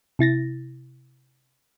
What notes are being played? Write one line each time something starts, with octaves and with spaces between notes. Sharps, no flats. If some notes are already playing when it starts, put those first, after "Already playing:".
C3 E4 A6 A#6